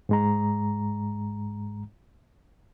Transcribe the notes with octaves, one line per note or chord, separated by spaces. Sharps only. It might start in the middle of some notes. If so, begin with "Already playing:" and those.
G#2 G#3 A#5